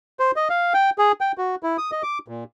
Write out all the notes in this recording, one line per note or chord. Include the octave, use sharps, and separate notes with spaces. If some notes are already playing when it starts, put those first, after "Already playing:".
C5
D#5
F5
G5
G#4
G5
F#4
E4
D#6
D#5
D6
A#2